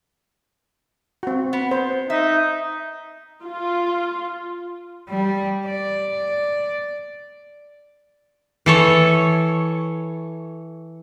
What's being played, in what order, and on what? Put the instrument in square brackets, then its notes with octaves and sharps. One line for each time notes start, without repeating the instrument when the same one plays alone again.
[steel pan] C4 F#4
[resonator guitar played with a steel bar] B3
[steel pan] C5
[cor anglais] D#4 [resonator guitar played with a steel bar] E5
[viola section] F4
[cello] G3
D5
[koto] E3 A4 C#5